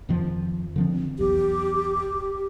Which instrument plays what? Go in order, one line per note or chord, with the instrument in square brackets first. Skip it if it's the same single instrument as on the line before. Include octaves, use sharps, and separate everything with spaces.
[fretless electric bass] F2 D#3 F3
D3 F3 C4
[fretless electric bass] B1 E2 [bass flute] G4